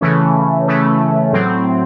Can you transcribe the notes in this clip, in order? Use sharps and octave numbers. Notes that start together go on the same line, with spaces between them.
C#3 E3 A3 C#4
C#3 E3 A3 C#4
A2 F#3 C4